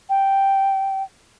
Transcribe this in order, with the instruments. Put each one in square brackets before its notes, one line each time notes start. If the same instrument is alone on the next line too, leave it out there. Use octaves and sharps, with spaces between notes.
[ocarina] G5